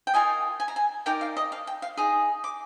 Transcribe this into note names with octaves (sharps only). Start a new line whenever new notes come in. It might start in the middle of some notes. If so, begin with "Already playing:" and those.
G5
F4 A#4 D#5 G#5
G#5
A#5
G#5
D#4 A#4 D5 G5
F5
D#5
F5
G5
F5
D#4 G#4
D6